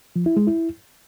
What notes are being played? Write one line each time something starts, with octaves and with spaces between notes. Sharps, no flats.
F3
E4
G#3
E4